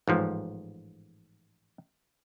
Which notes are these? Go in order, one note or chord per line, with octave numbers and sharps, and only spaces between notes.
A1 G#2 F3